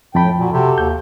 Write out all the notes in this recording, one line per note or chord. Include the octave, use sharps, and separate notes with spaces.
F2 A2 G5 A5 B5
D#2 A#2 F#4
C3 F#4 G4 A4
D#2 G6